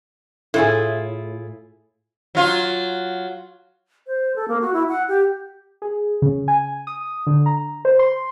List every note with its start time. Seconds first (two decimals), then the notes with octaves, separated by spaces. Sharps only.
0.54 A2 E4 F4 G#4
2.35 F#3 F4
4.07 C5
4.36 A4
4.48 A#3
4.61 F#4
4.74 E4
4.89 F#5
5.08 G4
5.82 G#4
6.22 C#3
6.48 G#5
6.87 D#6
7.27 D3
7.46 A#5
7.85 C5
7.99 C6